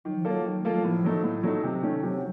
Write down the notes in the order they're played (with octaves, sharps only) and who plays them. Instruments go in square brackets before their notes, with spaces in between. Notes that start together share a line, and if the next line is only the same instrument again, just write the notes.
[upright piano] D#3 [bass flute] F#3
[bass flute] F3
[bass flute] F#3 [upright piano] A#3 F4 A4
[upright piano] D#3
[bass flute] A3 [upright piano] A#3 F4 A4
[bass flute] F#3
[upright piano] A2 [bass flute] F3
[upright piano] F#3 A3 D#4
A2
F#3 A3 D#4
C3
D#3 A3 C#4
[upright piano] C3 [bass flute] F#3